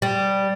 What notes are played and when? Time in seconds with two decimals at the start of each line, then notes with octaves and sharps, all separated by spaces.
0.02 G3